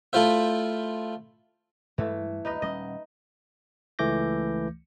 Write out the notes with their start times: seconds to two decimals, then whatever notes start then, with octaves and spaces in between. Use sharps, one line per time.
0.13 A3 E4 F4 C5 E5
1.98 G2 E3 G#3 A3
2.45 D2 G2 D#4 B4 D#5
2.62 D#1 G3 C#4 D#5
3.99 C#2 E3 A3 D6 G6 A#6